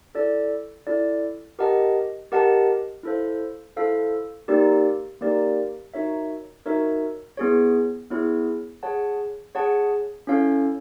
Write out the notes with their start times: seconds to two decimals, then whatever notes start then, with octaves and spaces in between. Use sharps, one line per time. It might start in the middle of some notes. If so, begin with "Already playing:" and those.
0.15 E4 A4 D5
0.87 E4 A4 D5
1.59 G4 A#4 D#5 F#5 A5
2.32 G4 A#4 D#5 F#5 A5
3.03 E4 A4 C5 F5
3.76 E4 A4 C5 F5
4.48 A#3 D#4 G4 A#4 D5
5.21 A#3 D#4 G4 A#4 D5
5.94 D#4 F#4 A#4 C#5 E5
6.66 D#4 F#4 A#4 C#5 E5
7.37 B3 E4 G#4 C#5
8.10 B3 E4 G#4 C#5
8.83 G#4 C#5 F#5 A5
9.55 G#4 C#5 F#5 A5
10.27 C#4 E4 A4 C#5 F5